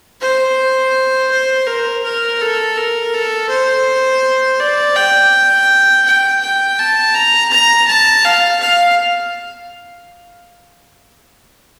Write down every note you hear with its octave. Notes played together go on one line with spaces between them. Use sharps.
C5
C5
A#4
A#4
A4
A#4
A4
C5
D5
G5
G5
G5
A5
A#5
A#5
A5
F5
F5